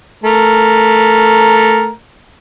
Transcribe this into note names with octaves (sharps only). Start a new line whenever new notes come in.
A3 A#4